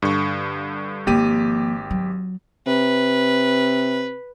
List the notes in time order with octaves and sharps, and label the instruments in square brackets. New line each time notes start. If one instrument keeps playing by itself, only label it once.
[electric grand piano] G2 D3 C#6
[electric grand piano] G#1 G4 D#7 [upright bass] F3 A#3
[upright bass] F#3
[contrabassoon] C3 [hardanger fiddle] B4